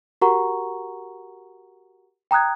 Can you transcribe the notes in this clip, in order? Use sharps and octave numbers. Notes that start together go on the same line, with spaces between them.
F#4 G4 A#4 F#5 A#5 C#6
G5 A#5 D#6 F#6 G#6